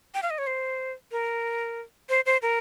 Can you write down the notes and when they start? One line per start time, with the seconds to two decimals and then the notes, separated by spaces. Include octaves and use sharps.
0.14 G5
0.23 F5
0.30 D#5
0.38 C#5
0.47 C5
1.12 A#4
2.09 C5
2.26 C5
2.42 A#4